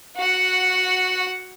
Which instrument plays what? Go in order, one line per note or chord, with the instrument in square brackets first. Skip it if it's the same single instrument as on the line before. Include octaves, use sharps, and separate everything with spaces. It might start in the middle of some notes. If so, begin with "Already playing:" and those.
[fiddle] F#4 F#5